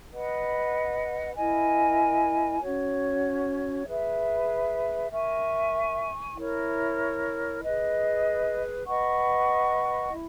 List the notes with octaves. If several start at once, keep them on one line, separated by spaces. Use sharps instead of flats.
B4 D#5 F#5
E4 A#4 D#5 G#5
C#4 F#4 C#5
G#4 B4 E5
A#4 E5 G#5 C#6
E4 A#4 C#5
G#4 B4 D#5
B4 D#5 F#5 C#6
E4